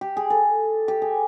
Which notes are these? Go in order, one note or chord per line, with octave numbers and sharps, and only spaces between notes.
G4
G#4
A4
G4
G#4